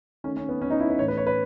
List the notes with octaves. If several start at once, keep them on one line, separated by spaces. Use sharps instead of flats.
D#3 A3 C#4
C#4
B3
C#4
D#4
E4
B4
A2 E3 A3 C#5
B4
C#5
B4